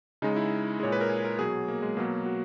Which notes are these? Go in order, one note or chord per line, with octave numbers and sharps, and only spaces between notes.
C#3 G#3 D#4
E4
A#2 G#3 C#5
B4
A#4
G#4
A#4
B2 F#3 G#4
A#3
G#3
B2 F#3 A#3
F#4